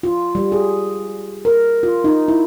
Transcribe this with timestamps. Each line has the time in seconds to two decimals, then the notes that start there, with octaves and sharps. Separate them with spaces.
0.03 F4
0.35 G3
0.52 G#4
1.45 A#4
1.83 F4
2.04 D#4
2.28 E4